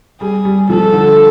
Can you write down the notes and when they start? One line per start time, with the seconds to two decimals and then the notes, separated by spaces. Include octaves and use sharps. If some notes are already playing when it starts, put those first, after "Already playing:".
0.21 G3 G#4
0.45 G3
0.69 F3 A4
0.93 D3